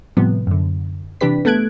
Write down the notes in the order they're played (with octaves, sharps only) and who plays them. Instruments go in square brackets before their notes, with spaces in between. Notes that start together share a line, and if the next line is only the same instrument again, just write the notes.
[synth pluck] A2 C3 F3 G3 B3
F#2 D3
C3 E3 D4 G4 B4 B6
A3 B3 A4 F#6 G#6 D7